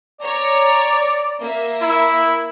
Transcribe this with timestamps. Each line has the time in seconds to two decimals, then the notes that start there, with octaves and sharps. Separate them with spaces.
0.21 C#5 D5 A#5
1.41 A#3 E5
1.82 E4